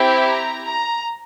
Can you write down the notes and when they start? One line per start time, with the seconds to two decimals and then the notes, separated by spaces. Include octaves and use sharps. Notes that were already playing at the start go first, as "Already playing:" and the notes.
Already playing: C4 E4 G4
0.31 A#5
0.69 A#5